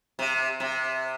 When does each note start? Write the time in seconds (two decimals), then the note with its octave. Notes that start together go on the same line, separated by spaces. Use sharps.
0.19 C3
0.60 C3